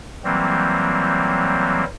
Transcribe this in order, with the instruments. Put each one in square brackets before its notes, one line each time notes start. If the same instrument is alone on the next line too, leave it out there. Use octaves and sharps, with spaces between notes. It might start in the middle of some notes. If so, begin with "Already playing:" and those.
[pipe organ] E3 F#3 G3 A#3 C4